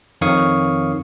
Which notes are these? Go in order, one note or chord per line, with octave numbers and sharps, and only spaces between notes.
F2 D#3 C#5 F5 C#6 D#6